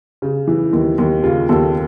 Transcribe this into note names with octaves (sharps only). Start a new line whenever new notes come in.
C#3
E3
D#2
D#2
C#3 F4
D#2 A4